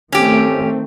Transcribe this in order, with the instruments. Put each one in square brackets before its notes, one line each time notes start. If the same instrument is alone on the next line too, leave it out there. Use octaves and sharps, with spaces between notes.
[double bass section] D#3 A3 C4 [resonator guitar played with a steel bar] C#4 G4